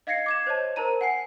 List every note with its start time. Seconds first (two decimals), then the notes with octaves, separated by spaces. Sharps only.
0.07 D#5 F5 G#6 A#6 C7 C#7
0.26 D6 G#6 E7
0.47 C5 C#5 D#5 A5
0.76 A#4 C5 A5 A#5 D#7
1.01 F#5 G#5 C7